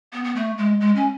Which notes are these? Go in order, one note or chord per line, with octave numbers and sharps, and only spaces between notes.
B3
B3
A3
G#3
G#3
C#4